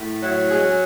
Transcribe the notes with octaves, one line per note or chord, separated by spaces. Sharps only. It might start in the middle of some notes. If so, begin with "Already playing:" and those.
Already playing: A2
F#3 E4
G#3 G#4
C#4